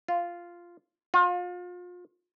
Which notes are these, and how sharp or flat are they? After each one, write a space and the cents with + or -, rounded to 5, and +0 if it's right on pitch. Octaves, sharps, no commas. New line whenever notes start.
F4 -5
F4 +35